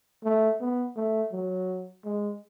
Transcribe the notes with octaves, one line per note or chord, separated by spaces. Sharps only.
A3
B3
A3
F#3
G#3